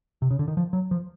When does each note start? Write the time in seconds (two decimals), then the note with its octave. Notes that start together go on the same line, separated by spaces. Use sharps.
0.22 C3
0.31 C#3
0.39 D3
0.48 D#3
0.57 F3
0.73 F#3
0.91 F3